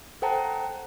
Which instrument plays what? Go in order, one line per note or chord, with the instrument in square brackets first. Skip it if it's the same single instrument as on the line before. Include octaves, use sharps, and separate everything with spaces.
[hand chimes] A4 C5 F#5 G5 A5 A#5